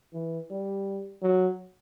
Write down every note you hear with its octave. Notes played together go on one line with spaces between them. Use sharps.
E3
G3
F#3